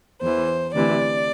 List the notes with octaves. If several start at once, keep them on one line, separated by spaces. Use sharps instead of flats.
E2 E3 C5
D2 C3 E3 D5